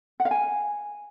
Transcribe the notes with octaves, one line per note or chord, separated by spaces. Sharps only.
F#5
F5
G#5